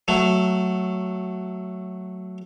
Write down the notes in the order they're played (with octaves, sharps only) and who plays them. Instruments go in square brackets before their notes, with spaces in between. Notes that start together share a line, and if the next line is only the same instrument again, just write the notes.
[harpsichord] F#3 A3